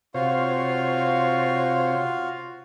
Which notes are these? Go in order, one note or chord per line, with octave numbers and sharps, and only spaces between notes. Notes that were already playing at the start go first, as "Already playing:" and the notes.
C3 F4 F#4 C5 C#5 F5